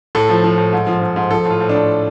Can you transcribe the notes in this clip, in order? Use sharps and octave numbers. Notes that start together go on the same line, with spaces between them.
A2 A4
F3
F3
A2
G#2
F3
G#2
G#2
F3 A4
A2 F4
A2
D4
A2